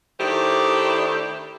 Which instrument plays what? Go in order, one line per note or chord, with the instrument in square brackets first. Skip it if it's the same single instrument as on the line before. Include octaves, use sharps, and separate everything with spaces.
[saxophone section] D#3 A3 D4 E4 G4 C5